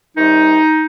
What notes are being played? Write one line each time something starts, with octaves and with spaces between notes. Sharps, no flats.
C3 D#3 G3 D#4